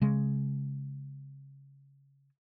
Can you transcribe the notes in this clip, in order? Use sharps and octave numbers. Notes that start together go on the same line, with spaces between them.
C#3 G#3